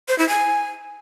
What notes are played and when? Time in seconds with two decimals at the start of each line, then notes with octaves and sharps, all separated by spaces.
0.08 C5
0.19 E4
0.29 G#5